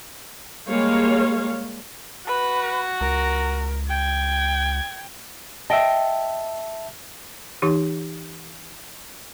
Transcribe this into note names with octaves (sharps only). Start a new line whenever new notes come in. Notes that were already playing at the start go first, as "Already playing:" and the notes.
G3 G#3 A#3 C#5 F5
F#4 B4
C#2 A#4
G5 G#6
D#5 E5 G5 A5
E3 D#4 G4